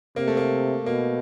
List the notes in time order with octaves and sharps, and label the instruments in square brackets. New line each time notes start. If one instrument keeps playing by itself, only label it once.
[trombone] C3 [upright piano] A#3
[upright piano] A3
A#3
[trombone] B2 [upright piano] A#3